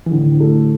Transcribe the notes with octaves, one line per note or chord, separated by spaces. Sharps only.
E3
A2 D3
A3